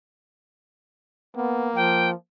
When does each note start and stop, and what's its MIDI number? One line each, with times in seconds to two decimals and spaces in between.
1.36 2.11 58
1.36 1.69 59
1.76 2.13 53
1.76 2.10 79